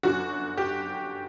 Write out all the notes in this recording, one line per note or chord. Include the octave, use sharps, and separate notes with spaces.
G1 F#2 F#3 F#4
G4